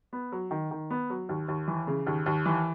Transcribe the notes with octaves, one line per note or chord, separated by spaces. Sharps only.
B3
F#3
D#3
D#3
B3
F#3
D#2
D#2
E3
C#3
D#2
D#2
E3